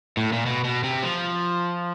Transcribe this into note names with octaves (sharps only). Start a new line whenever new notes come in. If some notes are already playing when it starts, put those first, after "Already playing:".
A2
A#2
B2
B2
C3
F3